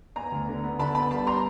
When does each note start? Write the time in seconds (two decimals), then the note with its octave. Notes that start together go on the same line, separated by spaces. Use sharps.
0.16 B3 G#5 A#5
0.32 D2
0.48 D3
0.63 B3
0.79 D3 A5 B5
0.95 B3 A5 B5
1.11 G3 A5 B5
1.27 A#5 C6